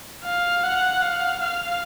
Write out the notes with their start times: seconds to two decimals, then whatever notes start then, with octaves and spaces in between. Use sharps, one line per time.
0.24 F5
0.63 F#5
1.02 F5
1.40 F5